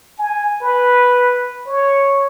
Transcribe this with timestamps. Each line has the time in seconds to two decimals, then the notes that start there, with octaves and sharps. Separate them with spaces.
0.19 G#5
0.61 B4
1.67 C#5